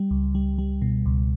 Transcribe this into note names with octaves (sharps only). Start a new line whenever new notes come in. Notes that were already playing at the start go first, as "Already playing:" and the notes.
Already playing: G3
C#2
G3
G3
B2
C#2